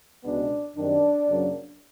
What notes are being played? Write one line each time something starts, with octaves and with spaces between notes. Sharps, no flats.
C#2 B2 G#3 B3 D4
F#2 D#3 G3 C4 D4
F#2 C#3 F#3 A#3